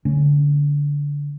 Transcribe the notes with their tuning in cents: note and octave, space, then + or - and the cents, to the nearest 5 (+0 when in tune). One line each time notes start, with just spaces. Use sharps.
D3 -20 A3 +0 C#4 +0